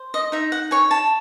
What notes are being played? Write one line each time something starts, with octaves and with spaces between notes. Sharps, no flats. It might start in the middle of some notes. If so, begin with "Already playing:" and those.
Already playing: C5
D#5
D#4 E5
F#5
C#5 G#5
A5